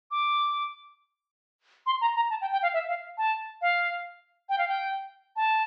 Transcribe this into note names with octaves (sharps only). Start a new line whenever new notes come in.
D6
C6
A#5
A#5
A5
G5
G5
F5
E5
F5
A5
F5
G5
F5
G5
A5